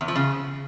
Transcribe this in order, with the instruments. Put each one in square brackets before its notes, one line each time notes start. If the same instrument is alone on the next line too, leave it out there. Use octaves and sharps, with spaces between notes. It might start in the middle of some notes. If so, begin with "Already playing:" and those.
[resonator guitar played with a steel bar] E2
F3
C#3